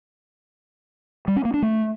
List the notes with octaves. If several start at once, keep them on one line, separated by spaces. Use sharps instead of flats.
G3
C#4
A#3
D4
A3